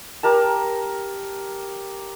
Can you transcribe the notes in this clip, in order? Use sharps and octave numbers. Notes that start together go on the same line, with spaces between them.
G4 A#4 A5